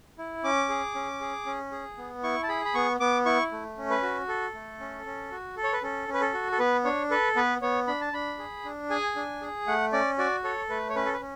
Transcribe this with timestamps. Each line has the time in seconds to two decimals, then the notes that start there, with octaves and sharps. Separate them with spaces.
0.18 E4
0.44 C#4 D6
0.69 G#4
0.95 C#4
1.21 G#4
1.46 C#4
1.72 G#4
1.98 B3
2.23 E4 C#6
2.43 A5
2.49 G#4 B5
2.65 B5
2.75 B3 C#6
3.00 B3 D6
3.25 E4 C#6
3.51 A3
3.77 C#4
3.90 B4
4.02 F#4
4.28 A4
4.54 A3
4.80 C#4
5.06 C#4
5.31 F#4
5.57 A4
5.63 C#5
5.73 B4
5.83 C#4 A4
6.08 C#4
6.13 B4
6.21 A4
6.34 F#4
6.52 A4
6.59 B3 B4
6.85 D4 C#5
7.11 A4 B4
7.36 B3 B4
7.62 B3 C#5
7.87 D4 B5
8.01 A5
8.13 D4 B5
8.39 G#4
8.64 D4
8.90 G#4 G#5
9.16 D4
9.42 G#4
9.67 A3 F#5
9.93 C#4 D5
10.18 F#4 D5
10.44 A4 C#5
10.70 A3 B4
10.89 C#5
10.95 C#4 B4
11.05 A4
11.13 B4
11.21 C#4